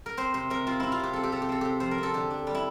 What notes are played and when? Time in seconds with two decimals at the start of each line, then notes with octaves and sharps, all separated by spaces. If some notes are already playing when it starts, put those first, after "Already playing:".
0.06 A#4
0.17 C4 C5
0.34 C3 C5
0.50 C3 A#4
0.67 C4 F4
0.80 C4 E4
0.92 F4
1.00 C3 G4
1.13 C4 A4
1.23 G4
1.32 C3 A4
1.42 G4
1.49 C4 A4
1.61 C3 G4
1.80 F3 C5
1.91 A#4
1.98 C4 A4
2.14 D3 G4
2.30 D4
2.47 G3
2.54 E4